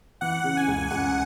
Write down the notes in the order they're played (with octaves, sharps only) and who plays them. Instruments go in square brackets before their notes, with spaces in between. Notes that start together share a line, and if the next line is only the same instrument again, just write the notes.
[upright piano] E3 [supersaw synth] F#5
[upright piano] C#3
[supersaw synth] G#5
[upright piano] C#2
[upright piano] C#2 [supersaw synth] F#5